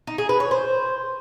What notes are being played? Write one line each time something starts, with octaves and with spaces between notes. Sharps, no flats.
D#4
G#4
B4
C#5
C5